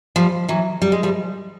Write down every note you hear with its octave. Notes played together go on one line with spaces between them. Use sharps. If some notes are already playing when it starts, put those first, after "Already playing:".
F3 G3
E3 F#3
G3
G#3
F3 G3